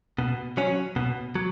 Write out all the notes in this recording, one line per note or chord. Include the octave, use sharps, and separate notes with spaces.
B2
F#3 C#4
B2
F#3